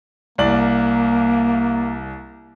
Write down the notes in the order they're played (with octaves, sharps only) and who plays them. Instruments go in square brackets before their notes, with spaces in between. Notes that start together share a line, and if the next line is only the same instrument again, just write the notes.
[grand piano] C2 D5 F#7 [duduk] A#3